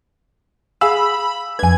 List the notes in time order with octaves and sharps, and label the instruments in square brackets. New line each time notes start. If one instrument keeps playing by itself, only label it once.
[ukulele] G#4 F5 G#5 [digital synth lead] B5 [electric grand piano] E6
[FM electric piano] F2 B4 [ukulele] D4 G#5 [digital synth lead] G#6